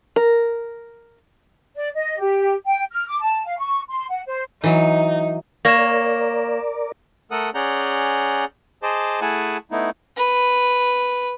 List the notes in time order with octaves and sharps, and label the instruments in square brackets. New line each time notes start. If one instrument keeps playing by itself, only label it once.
[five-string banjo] A#4
[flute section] D5
D#5
G4
G5
F6
D6
A5
F5
C#6
C6
F#5
C5
[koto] E3 F#3 [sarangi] D#4
[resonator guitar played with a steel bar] A#3 [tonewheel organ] A#4 D5 [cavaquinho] C#5 [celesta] A#6 E7
[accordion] A3 A4 A#4 F#5 D#6
C#4 G#4 D5 F#5 A#5 G6
G#4 C5 D#5 A5 D6
A3 E4 G#4 F#5 G#5 A5
A3 B3 D#4 E4
[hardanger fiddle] B4